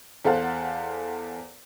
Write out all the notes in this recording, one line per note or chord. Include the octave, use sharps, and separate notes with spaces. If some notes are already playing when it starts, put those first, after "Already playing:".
E2 A4 C5 F5 F#5